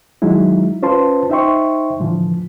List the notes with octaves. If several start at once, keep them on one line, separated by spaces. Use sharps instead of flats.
D#3 F#3 G#3 D#4 E4
C#4 F4 B4 C5 A5 C6
D#4 C5 E5 G5 C6 C#6
A2 D3 E3 F3